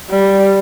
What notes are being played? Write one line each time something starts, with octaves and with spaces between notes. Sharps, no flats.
G3